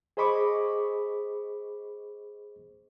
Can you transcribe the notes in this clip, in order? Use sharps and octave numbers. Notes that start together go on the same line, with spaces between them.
G#4 C5 D#5 B5 C#6 D6